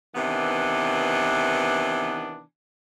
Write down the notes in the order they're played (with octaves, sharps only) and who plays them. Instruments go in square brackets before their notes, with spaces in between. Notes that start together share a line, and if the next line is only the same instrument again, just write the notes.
[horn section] C3 D#3 E3 B3 D4